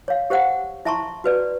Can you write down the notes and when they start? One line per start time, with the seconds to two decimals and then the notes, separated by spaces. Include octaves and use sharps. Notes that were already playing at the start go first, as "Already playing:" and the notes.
0.08 C#5 F5
0.30 G4 C5 F5 F#5
0.85 E4 E5 A5 A#5 C6 C#6
1.24 F#4 B4 D5